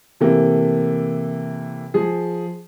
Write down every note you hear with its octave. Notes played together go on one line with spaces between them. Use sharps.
C3 E3 A3 A#3
F3 G#4